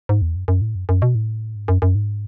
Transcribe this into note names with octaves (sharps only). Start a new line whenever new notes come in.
G#2
E2
F#2
F#2
A2
F#2
F#2
B2
A2
G#2
F#2
F#2
G#2